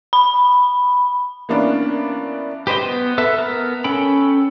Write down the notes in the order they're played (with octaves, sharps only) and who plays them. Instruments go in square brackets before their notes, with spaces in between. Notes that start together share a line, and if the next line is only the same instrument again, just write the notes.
[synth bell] B5
[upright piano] E3 A#3 B3 C#4 D4
[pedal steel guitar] G4 B4 C5 D#5 G5
B3
A4 B4 E5
B3 A#4
C#4 A4 G5 B5